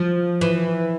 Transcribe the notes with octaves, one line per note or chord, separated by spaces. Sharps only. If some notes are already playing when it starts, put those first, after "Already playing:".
Already playing: F3
E3